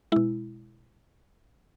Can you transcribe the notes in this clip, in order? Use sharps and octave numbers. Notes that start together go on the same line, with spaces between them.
B2 G#3 E4